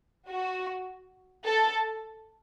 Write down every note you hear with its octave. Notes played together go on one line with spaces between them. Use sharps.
F#4
A4